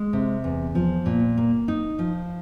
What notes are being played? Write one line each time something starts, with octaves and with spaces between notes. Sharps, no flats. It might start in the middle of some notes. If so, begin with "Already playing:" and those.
Already playing: G#3
C3
E2
F3
A#2
A#3
D#4
F3